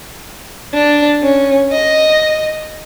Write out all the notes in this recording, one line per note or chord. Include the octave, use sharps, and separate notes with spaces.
D4
C#4
D#5